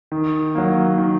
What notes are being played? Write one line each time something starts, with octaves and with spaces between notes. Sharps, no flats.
D#3
F#3 A#3
D#3